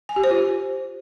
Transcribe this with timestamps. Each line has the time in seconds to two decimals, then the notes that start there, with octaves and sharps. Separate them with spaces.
0.09 G#5
0.16 G4
0.24 C5
0.31 F4